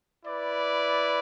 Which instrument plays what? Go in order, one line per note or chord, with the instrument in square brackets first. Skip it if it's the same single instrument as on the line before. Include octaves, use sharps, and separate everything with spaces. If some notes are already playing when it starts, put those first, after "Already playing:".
[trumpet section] E4 B4 D5